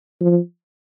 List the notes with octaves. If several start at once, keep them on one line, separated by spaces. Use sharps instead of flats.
F3